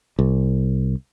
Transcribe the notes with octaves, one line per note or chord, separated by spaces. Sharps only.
C2